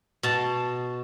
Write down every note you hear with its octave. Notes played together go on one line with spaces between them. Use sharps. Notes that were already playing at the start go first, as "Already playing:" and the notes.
B2 A5